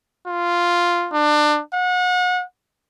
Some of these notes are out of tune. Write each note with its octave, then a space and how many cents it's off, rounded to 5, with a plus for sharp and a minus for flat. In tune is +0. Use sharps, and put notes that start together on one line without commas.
F4 -5
D4 +25
F#5 -35